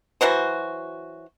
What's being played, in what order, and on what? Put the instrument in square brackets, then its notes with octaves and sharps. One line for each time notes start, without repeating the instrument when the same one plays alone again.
[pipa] E3 F#3 F#4 C5